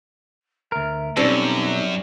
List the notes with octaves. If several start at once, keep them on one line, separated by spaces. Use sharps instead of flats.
D2 A#4 E5
F#2 B2 G3 C4 C#4 D#4 A4